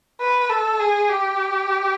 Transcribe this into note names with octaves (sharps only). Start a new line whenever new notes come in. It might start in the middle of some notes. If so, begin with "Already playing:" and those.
B4
A4
G#4
G4